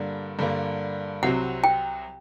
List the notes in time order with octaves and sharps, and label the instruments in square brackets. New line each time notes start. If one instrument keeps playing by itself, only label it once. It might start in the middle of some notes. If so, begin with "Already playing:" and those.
Already playing: [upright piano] G2 D3 G3 A#3
G2 D3 G3 A#3
[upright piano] C2 C3 F#3 C4 F#4 [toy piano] F#5
[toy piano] G5